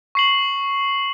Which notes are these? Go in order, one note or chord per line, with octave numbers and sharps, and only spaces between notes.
C#6 C7 F#7